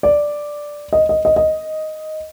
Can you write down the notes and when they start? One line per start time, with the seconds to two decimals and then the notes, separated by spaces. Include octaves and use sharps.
0.03 D5
0.93 D#5
1.09 D#5
1.25 D#5
1.36 D#5